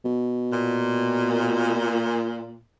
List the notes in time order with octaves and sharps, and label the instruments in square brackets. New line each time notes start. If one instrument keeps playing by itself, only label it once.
[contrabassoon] B2
[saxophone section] A#2